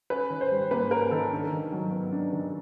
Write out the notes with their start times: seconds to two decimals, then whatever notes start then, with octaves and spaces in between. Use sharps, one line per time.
0.10 C#4 B4
0.30 D#3
0.41 C5
0.51 G3
0.71 A#3 B4
0.91 C#4 A#4
1.11 D#3 A4
1.32 D4
1.52 D#3
1.72 F#3
1.92 B3
2.12 D4
2.33 D#3